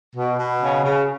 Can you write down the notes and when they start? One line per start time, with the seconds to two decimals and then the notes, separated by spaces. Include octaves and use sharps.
0.16 B2
0.39 B2
0.61 C#3
0.84 C#3